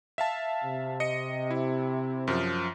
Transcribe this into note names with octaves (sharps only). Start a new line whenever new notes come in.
E5 F5 A5
C3
D#5 C#7
E4
F#2 F3